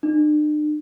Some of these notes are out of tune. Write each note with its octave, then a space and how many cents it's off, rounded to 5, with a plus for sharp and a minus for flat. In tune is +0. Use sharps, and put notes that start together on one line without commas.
D4 +45